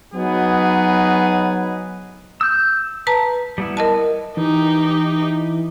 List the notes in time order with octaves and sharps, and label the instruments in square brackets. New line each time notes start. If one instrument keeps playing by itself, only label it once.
[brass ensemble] F#3 B3 D#4 F#4 G#4 B4
[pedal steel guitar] E6 G6
[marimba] B4 A5 A#5
[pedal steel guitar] G3 B3 E4
[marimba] A#4 D#5 A5
[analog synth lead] E3 [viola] D#4 G4